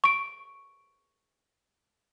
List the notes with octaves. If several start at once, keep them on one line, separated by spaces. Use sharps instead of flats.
C#6 D7